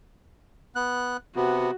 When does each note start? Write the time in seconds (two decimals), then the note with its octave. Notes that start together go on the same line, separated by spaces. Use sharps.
0.76 B3 F#6
1.36 C3 B3 F#4